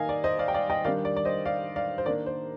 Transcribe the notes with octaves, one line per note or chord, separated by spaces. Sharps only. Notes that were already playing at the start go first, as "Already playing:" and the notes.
Already playing: D#3 A#3 D#4 D#5 F5 G#5
D5
C5 D#5
D5 F5
G5
D5 F5
D#5 G5
D#3 G3 D4 D5 F5
D5
D5
C5 D#5
D5 F5
D5 F5
C5
D#3 A#3 D4 D5
C5